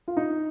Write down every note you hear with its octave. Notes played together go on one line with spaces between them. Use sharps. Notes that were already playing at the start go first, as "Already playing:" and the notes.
F4
D#4